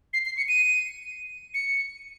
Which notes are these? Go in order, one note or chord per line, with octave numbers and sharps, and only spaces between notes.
C7
C7
C#7
D#7
C#7